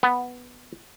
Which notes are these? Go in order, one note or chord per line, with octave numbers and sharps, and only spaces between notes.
B3